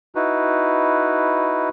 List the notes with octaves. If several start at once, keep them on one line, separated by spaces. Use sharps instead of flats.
D#4 E4 F#4 B4